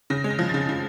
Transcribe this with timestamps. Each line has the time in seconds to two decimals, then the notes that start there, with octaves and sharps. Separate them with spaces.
0.10 C#3 A#6
0.24 G#3
0.30 A#6
0.39 F3
0.49 C#3 A6
0.69 C#3